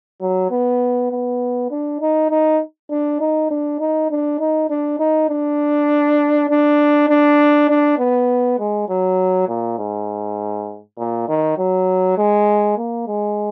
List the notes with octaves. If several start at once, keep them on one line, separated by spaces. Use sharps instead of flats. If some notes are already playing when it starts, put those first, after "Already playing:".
F#3
B3
B3
D4
D#4
D#4
D4
D#4
D4
D#4
D4
D#4
D4
D#4
D4
D4
D4
D4
B3
G#3
F#3
A#2
G#2
A#2
D#3
F#3
G#3
A#3
G#3